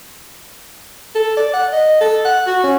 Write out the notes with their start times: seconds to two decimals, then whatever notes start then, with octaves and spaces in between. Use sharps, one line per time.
1.15 A4
1.37 D5
1.53 F#5
1.73 D#5
2.01 A4
2.25 F#5
2.47 F#4
2.63 C#4